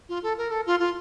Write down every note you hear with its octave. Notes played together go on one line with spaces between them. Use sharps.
F4
A4
A#4
A4
F4
F4